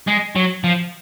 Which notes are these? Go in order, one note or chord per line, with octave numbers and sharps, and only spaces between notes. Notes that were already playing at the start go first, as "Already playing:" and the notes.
G#3
F#3
F3